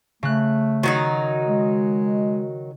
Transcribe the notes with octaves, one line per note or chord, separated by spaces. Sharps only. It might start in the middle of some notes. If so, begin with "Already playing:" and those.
C#3 A3 F#6
D#3 F#3 D#4 F#4
G#3